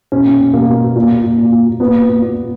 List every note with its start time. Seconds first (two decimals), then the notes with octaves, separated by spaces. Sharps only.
0.12 B2 C#4
0.25 B2
0.39 B2
0.53 B2 A#3
0.67 B2
0.82 B2
0.96 A#2
1.09 A#2
1.23 A#2
1.37 A#2
1.52 A#2
1.66 A#2
1.80 A#2 B3
1.93 A#2
2.09 A#2
2.22 A#2
2.35 A#2